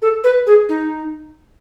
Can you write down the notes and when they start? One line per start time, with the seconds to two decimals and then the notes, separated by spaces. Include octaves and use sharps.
0.02 A4
0.24 B4
0.47 G#4
0.69 D#4